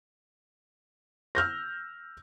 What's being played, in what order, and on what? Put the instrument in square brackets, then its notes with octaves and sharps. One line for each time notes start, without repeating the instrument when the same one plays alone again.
[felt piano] E6 F6 G6 A#6